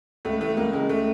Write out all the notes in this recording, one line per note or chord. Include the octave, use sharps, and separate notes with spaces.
C#2 A3
E3 A3
C#2 A#3
C#3 G#3
A3